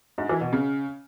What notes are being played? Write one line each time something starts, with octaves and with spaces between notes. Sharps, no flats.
G#2
E3
B2
C#3